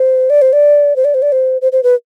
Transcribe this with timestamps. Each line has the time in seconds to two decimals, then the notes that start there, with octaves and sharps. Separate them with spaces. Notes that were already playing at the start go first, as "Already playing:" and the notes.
Already playing: C5
0.30 D5
0.42 C5
0.53 D5
0.96 C5
1.05 D5
1.14 C5
1.22 D5
1.32 C5
1.62 C5
1.72 C5
1.83 B4